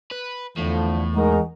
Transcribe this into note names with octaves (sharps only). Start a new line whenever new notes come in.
B4
E2 A2 D3 F3 A3
G#3 D#4 F#4 A#4